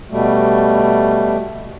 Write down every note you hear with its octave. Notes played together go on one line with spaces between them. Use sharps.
B2 G3 A3